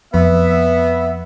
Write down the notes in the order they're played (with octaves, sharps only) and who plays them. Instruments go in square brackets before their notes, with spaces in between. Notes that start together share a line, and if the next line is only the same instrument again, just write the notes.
[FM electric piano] F2 [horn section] B3 E5